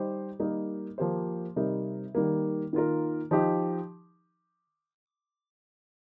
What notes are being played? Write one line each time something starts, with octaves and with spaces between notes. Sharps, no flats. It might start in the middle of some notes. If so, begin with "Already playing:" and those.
Already playing: G3 D#4 G4 C5
G3 A#3 D#4 A#4
F3 A#3 G4 C5
C3 G3 D#4 A#4
D#3 G3 A#3
D#3 A#3 F4 A#4
F3 D#4 G4